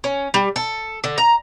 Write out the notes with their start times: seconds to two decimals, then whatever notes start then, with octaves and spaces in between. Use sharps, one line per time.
0.04 C#4
0.34 G3
0.56 A4
1.04 D3
1.18 A#5